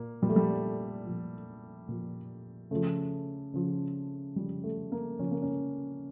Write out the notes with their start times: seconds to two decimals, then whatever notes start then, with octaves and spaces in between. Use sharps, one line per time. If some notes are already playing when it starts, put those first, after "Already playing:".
Already playing: A#2 A#3
0.22 A#2 F3 G3
0.29 A3
0.36 G3
1.06 A#2 F3
1.88 A#2 F3
2.71 C#3 F3 A3
3.54 C#3 F3
4.36 C#3 F3 G3
4.64 A3
4.92 A#3
5.19 C#3 F3 C#4
5.31 A#3
5.42 C#4